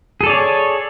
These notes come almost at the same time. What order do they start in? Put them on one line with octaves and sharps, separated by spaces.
G#4 A4 D5 C#5